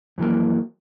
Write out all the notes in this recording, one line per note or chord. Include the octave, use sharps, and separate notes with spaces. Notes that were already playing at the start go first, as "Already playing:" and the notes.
F2 E3 F#3 A#3